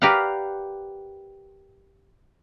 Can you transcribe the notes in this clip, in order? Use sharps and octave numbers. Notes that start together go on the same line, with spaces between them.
G4 A#4 B4 D5 F5 F#5